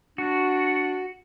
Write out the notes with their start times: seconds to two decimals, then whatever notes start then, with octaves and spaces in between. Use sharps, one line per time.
0.18 D4 F#4